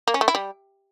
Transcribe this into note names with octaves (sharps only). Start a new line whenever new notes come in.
A#3
C#4
A3
E4
G3